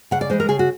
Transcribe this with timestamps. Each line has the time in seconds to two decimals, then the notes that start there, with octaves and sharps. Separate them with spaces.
0.11 C#3 F#5
0.21 D5
0.30 E3 G#3 C5
0.40 A#4
0.49 C#3 G#4
0.59 F#4